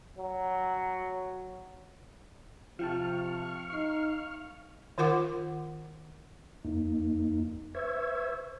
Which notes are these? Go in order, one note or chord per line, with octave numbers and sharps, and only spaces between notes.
F#3
C3 F3 F5 G5 A5 C#6 F6
D#4 C7
D#3 F4 A#4 F#5 D6
F2 A#3 D#4
B4 C5 E5 C#6 E6 G#6